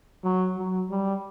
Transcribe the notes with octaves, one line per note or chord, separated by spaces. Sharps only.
F#3
F#3
G3